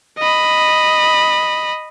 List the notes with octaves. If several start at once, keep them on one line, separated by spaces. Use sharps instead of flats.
D#5 B5